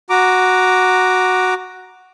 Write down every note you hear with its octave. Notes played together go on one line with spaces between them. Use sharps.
F#4 A#5 D6